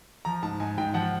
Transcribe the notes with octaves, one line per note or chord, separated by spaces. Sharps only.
F3 A#5
G#2 A5
G#2 G#5
G#2 G5
F3 F#5